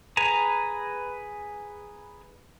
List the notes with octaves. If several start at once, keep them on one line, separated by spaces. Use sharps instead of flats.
G#4 B4 G#5 A#5